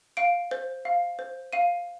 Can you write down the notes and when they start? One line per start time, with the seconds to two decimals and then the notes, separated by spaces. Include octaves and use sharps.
0.17 F5 D7
0.51 C5
0.85 F5
1.19 C5
1.53 F5 D#7